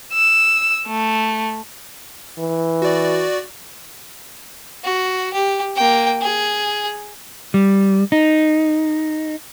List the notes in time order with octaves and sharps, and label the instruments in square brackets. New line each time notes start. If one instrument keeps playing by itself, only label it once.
[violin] E6
A3
[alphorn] E3
[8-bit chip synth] F#4 D5
[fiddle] F#4
G4
A#3 G5
G#4
[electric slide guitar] G3
D#4